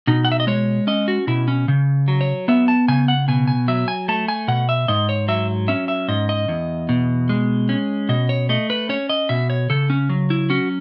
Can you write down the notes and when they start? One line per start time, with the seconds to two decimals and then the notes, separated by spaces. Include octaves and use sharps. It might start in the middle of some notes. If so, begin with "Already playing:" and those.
0.07 B2 D#4
0.25 F#5
0.32 E5
0.40 D#5
0.47 G#3 C#5
0.87 C#4 D#5
1.08 F#4
1.27 B2 E4
1.48 C#4
1.68 C#3
2.08 F#3
2.21 C#5
2.48 B3 E5
2.68 A5
2.88 C#3 G#5
3.08 F#5
3.28 B2 G#5
3.48 G#5
3.68 F#3 E5
3.88 G#5
4.08 A3 A5
4.28 G#5
4.48 B2 F#5
4.69 E5
4.88 G#2 D#5
5.09 C#5
5.28 F#3 E5
5.68 C#4 E5
5.88 E5
6.08 G#2 D#5
6.29 D#5
6.48 E2
6.89 B2
7.29 G#3
7.69 C#4
8.09 B2 D#5
8.29 C#5
8.49 A3 D#5
8.70 B4
8.89 C#4 C#5
9.09 D#5
9.29 B2 E5
9.50 C#5
9.70 C#3 A4
9.90 C#4
10.09 F#3
10.30 E4
10.50 C#4 F#4